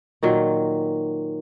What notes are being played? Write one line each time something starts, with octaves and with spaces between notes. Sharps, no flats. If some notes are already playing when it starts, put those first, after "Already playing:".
A#2 D#3 F#3